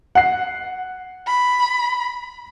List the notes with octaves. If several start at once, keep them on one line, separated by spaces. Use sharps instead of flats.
F#5 C7
B5